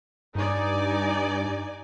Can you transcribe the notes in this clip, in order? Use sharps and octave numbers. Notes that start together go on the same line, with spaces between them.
G2 D#4 D5 G#5